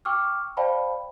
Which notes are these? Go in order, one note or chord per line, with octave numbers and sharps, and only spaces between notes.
G5 C#6 D6 E6 F6
C5 D5 F5 G5 A5 B5